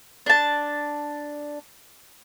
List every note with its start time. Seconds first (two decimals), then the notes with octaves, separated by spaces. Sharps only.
0.26 D4 A5